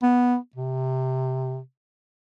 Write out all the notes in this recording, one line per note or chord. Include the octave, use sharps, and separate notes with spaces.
B3
C3